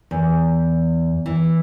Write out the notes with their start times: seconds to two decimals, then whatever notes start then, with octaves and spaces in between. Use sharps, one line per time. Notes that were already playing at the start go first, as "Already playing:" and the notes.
0.11 E2
1.26 E3